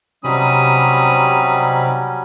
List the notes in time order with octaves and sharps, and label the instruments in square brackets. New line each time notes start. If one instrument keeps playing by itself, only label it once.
[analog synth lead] C3 [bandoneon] F#3 G3 C#4 [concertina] C4 D#4 B5 [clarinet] D#6